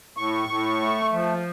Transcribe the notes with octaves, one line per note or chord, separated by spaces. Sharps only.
A2 C#6
A2
A3
F3